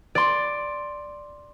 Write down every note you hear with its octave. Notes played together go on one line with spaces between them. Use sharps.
D5 C6